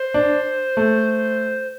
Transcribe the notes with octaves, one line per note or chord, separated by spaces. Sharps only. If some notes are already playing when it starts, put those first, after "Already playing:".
Already playing: C5
D4
A3